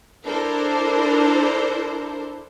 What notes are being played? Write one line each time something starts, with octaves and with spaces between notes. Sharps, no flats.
D4 E4 A4 A#4 C5